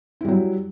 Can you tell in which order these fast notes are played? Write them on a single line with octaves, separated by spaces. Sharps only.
E4 G3 F#3